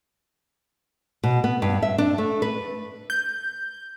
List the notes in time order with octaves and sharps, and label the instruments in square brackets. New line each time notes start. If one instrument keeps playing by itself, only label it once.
[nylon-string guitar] B2
B3
G2
E5
D4
A3
B4
[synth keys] G6